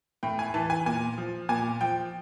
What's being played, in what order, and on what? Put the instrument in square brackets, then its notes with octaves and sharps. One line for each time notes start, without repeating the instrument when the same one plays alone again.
[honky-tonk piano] A2 G5
G#5
E3 A5
G#5
A#2 G#5
F3
A#2 G#5
F3 G5